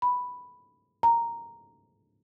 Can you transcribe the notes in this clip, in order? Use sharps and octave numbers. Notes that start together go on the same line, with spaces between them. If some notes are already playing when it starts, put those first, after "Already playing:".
B5
A#5